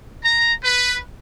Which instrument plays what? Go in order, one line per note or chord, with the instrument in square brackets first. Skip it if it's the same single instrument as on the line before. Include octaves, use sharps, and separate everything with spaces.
[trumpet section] A#5
B4